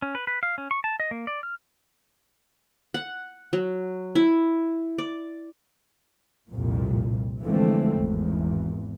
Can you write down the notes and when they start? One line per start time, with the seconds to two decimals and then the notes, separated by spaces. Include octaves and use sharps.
0.02 C#4
0.15 B4
0.27 B4
0.43 F5
0.58 C#4
0.71 C#6
0.84 A5
1.00 D#5
1.11 A#3
1.27 D5
1.43 F6
2.94 F#5
3.53 F#3
4.15 E4
4.98 D5
6.50 C2 F2 A#2
7.43 D3 E3 F3 G#3 A3 C4
7.98 G#1 E2